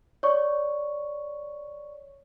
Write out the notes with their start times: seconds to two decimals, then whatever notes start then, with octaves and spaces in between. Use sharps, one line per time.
0.23 C#5 D5 C#6